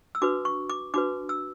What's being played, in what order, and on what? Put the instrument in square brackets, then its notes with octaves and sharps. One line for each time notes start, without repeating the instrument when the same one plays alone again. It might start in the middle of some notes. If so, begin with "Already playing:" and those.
[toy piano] E6
D4 F#4 B4 D6
C#6
D6
D4 F#4 B4 D6
E6